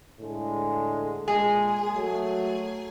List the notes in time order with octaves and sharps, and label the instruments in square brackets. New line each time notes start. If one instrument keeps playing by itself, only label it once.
[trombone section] A2 D3 G#3
[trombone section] A#2 G#3 [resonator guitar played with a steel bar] G#4
[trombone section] F#3 A3